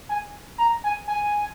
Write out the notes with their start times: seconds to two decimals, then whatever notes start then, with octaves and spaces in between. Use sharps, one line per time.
0.09 G#5
0.58 A#5
0.84 G#5
1.08 G#5